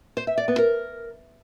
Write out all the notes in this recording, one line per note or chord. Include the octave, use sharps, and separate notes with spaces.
C5
E5
D5
B3
A#4